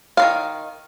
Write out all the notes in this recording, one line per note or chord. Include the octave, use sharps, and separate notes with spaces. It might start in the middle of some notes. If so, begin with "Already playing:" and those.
D#3 F#3 F5